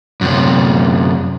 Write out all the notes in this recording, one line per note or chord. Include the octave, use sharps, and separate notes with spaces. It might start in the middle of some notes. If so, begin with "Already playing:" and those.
F#2 C3